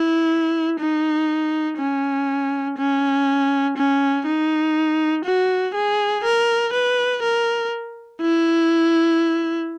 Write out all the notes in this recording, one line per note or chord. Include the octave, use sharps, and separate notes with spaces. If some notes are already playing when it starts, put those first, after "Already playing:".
Already playing: E4
D#4
C#4
C#4
C#4
D#4
F#4
G#4
A#4
B4
A#4
E4